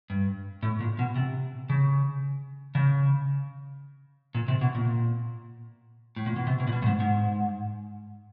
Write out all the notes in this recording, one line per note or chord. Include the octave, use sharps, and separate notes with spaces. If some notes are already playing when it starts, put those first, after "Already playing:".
G2
A2
A#2
B2
C3
C#3
C#3
A#2
C3
B2
A#2
A2
A#2
B2
C3
B2
A#2
B2
G2
G#2
G#2